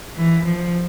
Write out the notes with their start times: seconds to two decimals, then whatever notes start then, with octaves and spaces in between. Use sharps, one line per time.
0.16 E3
0.45 F3